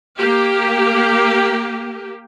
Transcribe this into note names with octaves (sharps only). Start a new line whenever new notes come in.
A#3 G4